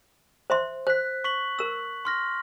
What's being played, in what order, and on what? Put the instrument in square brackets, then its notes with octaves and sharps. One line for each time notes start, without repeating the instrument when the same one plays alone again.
[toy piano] C5 E5 C6
[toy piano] C5 [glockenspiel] F#6 B6
[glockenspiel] C#6 B6 F#7
[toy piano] A#4 E6
[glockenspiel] C6 F6 A#6